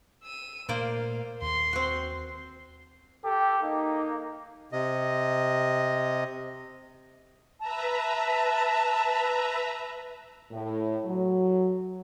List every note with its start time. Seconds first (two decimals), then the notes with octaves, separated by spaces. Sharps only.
0.24 E6 D#7
0.69 A#2 A3 A#3 C5 D5 F5
1.42 D#2 C6 C7
1.73 C4 F#4
3.24 G4 A4
3.62 A#3 D#4
4.72 C3 D#5
7.60 B4 E5 A5 A#5
10.51 A2
11.06 F#3